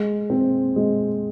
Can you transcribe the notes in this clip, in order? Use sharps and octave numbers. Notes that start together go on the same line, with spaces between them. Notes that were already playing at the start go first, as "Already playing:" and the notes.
Already playing: G#3
C4
G#3